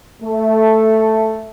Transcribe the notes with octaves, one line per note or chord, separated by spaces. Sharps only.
A3